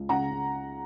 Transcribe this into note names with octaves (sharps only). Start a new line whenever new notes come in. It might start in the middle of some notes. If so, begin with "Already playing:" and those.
Already playing: C#2
C#3 F#5 A#5
C#3